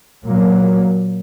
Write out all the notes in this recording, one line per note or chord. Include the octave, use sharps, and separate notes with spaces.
A#2 F#3 A#3